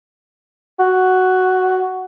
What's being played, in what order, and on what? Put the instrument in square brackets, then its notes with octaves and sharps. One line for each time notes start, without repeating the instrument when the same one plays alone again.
[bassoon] F#4